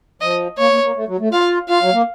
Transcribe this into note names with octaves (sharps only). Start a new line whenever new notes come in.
F3 D#5
A#3 C#5
A#3
A#3
A3
F#3
A3
F4 F5
F4 F5
F#3
A#3